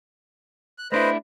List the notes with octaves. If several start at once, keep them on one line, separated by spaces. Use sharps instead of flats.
F#6
A3 D4 E4 B4 C5 D#5